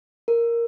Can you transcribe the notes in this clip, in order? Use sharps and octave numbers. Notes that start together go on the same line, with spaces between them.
A#4